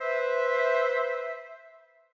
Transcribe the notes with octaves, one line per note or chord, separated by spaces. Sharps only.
B4 C5 E5